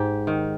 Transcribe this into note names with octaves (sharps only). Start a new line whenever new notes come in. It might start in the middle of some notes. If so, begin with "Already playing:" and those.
Already playing: G#2 G4
D#3